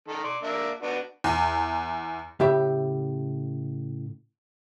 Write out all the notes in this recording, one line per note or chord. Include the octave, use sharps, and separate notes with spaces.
D#3 A4
D5 C6
A#3 D4 E5
B3 D4 F#4
E2
A2 C#3 G4 E5